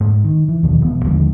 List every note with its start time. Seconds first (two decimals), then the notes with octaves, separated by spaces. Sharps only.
0.01 G#2
0.24 D#3
0.48 E3
0.63 D#2 B2 D#3 F3
0.82 E1 B3
1.04 D#2 D3 F3 G#3